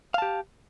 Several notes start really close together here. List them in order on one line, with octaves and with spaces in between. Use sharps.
F5 A5 G4